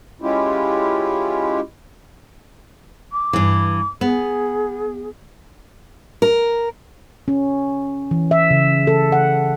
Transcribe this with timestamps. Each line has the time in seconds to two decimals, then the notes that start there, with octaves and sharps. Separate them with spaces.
0.21 G#3 C#4 E4 F4 G4
3.12 D6
3.33 G2 E3
4.01 B3 G#4
6.22 A#4
7.28 C#4
8.11 E3
8.31 E5
8.51 C#3
8.87 A4
9.12 F#5